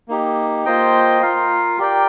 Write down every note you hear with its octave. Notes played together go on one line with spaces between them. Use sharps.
A#3 D#4 G4
A#3 F4 C5 D#5 G5
F4 A#4 F5
G4 A#4 D5 G5